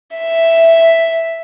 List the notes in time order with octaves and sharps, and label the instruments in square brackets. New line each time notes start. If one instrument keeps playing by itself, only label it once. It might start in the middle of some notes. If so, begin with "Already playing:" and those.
[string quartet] E5